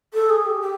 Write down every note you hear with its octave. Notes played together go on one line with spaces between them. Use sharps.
A4
G#4
G4
G4